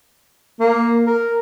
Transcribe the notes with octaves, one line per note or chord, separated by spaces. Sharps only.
A#3
A#4